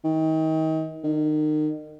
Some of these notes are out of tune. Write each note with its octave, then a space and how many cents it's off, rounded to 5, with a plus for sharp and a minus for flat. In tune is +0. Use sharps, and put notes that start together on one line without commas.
D#3 +35
D#3 -30